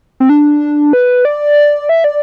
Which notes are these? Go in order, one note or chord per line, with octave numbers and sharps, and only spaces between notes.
C4
D4
B4
D5
E5
D5